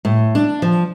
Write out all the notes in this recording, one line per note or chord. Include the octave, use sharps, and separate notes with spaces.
A2
D4
F3